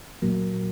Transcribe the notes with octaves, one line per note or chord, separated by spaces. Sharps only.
A#2 F#3 A#3